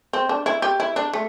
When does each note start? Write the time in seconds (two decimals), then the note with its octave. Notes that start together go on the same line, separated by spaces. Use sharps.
0.13 C4
0.29 D4
0.46 E4
0.62 G4
0.80 E4
0.96 D4
1.13 A3